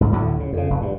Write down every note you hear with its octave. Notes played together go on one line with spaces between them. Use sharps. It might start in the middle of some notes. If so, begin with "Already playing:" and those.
C2 G#2
D2 A2 D3 F#3
C#3
F2 C#3
F1
G2